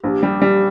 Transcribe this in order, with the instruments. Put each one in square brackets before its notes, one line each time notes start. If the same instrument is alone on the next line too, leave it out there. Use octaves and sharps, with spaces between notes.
[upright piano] A#1 [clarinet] G4
[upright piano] G3
G3